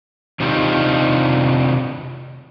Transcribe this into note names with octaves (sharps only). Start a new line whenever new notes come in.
C3 D#3 D4 D#4 F4 G4